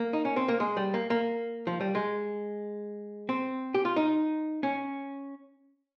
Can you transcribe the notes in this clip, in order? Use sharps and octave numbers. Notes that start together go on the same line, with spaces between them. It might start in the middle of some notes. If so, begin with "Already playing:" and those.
Already playing: A#3
D#4
C#4
C4
A#3
G#3
G3
A#3
A#3
F3
G3
G#3
C4
G4
F4
D#4
C#4